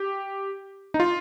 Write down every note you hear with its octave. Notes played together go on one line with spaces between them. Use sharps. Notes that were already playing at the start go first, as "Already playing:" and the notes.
Already playing: G4
D#4
F4